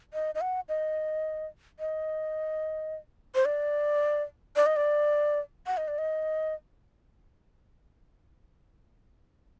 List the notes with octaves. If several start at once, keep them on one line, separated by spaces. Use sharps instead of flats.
D#5
D#5
F#5
D#5
D#5
C5
D5
D5
D#5
D5
F#5
D#5
D5
D#5